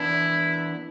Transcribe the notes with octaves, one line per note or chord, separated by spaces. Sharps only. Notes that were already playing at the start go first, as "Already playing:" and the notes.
Already playing: E3 B3 D4 E4